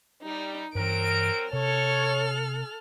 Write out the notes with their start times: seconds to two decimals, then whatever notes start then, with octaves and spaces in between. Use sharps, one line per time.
0.23 G3 D#4
0.75 G2 E3 F#3 C4 A#4 D7
1.53 C3 A4 C#5 F6